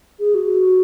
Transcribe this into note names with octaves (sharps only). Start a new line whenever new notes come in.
G#4
F#4